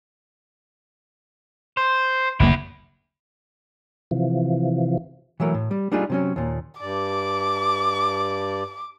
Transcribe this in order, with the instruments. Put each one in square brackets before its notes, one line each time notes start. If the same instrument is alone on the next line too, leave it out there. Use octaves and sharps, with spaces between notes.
[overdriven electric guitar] C5
[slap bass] F#1 D2 A#3 [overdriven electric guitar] B3 E4
[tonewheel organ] C3 E3 F3
[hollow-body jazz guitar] E3 F#3 A3 A#4
A2
G3
G3 A3 D4 D#4 F4 G#4
C3 F#3 C#4
D#2 A#2
[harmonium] G2 D5 [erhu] D6